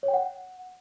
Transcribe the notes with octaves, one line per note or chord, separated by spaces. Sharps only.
C#5
G5
F#5